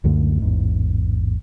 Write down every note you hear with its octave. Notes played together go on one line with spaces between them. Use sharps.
C#2 F#2 D3 A3
A1 E2 G#2